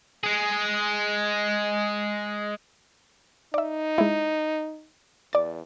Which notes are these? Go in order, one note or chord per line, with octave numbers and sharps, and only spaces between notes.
G#3 G#4
D#4 D5 E5
G#3 E4
E2 D5 A6